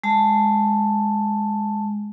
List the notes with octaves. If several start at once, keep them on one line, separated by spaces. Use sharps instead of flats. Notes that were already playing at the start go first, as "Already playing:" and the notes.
G#3 A5